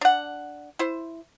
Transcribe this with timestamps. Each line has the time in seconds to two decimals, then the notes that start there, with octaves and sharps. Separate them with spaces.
0.01 D4 F#5
0.79 E4 C5